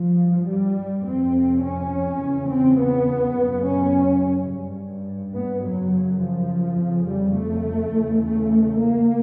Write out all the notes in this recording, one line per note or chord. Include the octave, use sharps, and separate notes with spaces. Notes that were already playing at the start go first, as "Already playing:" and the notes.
Already playing: G2 F3
G3
F2 C3 C4
C#4
E2 C#3
C4
B3
F#2 C#3
C#4
G2
B3
F#2 C#3 F#3
F3
F2 C#3
G3
A3
E2 C#3
A3
A#3